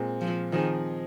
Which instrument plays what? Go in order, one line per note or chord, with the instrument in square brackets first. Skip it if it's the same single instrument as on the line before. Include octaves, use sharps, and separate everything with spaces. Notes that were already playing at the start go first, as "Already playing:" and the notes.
Already playing: [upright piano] A#2 G#3 C4
[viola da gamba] F3
[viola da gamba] D#3 [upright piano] F3 C4 D#4 G#4